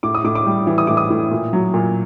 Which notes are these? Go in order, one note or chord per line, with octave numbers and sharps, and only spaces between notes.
A2 D6
D#6
A2 D6
D6
G3
E3
D#6
A2 D6
D#6
A2
A#2
F#3
A#2